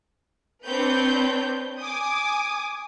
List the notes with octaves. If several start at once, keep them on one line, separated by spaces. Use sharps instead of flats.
C4 D4 B4 C#5 G6
G#5 D6 D#6